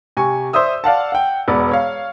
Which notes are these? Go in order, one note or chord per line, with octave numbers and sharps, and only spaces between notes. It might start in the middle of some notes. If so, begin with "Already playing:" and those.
C3 G#5 C#6
C5 D5 E5 D#6 E6
D5 F5 F#5 A5
F#5 G5
E1 B3 B4 D5
C#5 F5